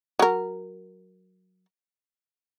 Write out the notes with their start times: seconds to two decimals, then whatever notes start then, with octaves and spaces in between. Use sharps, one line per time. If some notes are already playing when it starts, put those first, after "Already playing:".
0.19 F#3 A#4